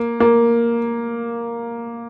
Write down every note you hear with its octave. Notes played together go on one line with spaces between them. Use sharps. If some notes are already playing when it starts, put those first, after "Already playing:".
Already playing: A#3
A#3